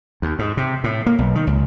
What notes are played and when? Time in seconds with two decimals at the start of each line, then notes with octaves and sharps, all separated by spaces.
0.22 D#2
0.39 G#2
0.57 C3
0.84 A2
1.06 A#3
1.18 B1
1.35 D#3
1.47 C#2